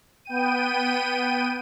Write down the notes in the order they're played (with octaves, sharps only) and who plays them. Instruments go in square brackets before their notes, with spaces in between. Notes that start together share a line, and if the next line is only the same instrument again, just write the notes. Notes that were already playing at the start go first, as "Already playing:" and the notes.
[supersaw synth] B3 G5 D#7